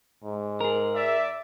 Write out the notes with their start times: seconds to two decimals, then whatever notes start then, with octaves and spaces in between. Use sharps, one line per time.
0.23 G#2
0.61 G#4 A#4
0.95 D5 E5